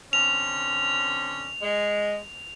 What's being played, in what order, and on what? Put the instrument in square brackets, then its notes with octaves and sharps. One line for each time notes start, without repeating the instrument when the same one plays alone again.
[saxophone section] D3 C4 C#4 [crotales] F7
[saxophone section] G#3